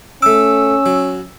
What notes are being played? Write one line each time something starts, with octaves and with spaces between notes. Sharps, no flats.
A3 C#4 D6 E6
F#3